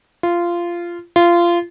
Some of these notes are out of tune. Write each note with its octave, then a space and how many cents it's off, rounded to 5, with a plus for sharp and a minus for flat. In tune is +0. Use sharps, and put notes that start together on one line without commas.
F4 -15
F4 -20